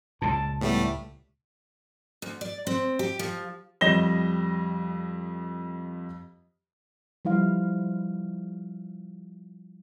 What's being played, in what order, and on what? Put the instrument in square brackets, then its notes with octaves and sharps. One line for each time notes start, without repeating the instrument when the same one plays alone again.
[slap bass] C#2 A#2 [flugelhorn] A5
[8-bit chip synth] A2 G3 A3 [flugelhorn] B3
[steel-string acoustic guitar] D2
D5
C4
G4
F3
[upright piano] F2 G3 D#5 A#6 E7 G7
[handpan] F3 G3 E4 F5